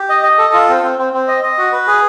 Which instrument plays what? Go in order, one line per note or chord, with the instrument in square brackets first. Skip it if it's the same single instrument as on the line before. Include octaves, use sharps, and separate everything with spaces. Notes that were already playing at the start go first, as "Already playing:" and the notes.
Already playing: [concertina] G4
D#5
D#5
A4
F4
C4
C4
C4
C4
D#5
D#5
F#4
B4
G#4